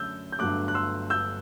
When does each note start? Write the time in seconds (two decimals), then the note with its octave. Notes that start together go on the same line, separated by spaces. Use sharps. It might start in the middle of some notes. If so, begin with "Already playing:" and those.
Already playing: F#2 D3 A3 E6 G6
0.32 G6
0.39 G1 G2 F#3 A3 D6 F#6
0.68 F#6
0.74 C6 E6
1.10 E6 G6